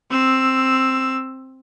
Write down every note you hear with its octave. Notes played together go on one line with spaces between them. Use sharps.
C4 E6